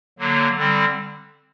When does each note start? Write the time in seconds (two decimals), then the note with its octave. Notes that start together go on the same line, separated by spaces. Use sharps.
0.19 D3 F#3 A#3
0.56 D3 G3 C4